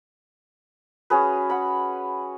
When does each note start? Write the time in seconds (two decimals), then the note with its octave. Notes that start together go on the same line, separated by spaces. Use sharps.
1.10 C#4 F#4 G#4 B4
1.50 F#5 B5